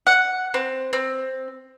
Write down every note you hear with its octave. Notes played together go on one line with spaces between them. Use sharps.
F#5
C4
C4